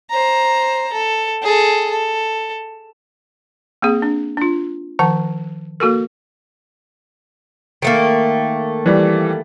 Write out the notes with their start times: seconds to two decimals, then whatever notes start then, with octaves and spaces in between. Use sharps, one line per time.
0.10 C5 A#5
0.92 A4
1.42 G#4 A4
1.90 A4
3.82 A#3 C4 G#4
4.02 D4
4.37 D4 F4
4.99 D#3 F3 F#5 A5
5.80 A#3 F#4 A4 A#4
7.82 D#3 A3 A#3
8.86 E3 G3